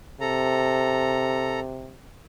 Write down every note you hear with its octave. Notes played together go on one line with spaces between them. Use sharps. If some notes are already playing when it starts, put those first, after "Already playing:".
C3 A4 A#5